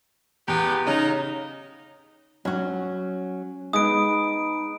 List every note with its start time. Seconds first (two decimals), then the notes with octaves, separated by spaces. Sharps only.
0.48 E2 B3 G4
0.87 C#3 D#4
2.45 F#3 C#4 F#4
3.73 G#3 B3 D#4 G#4 B4 D#6 D7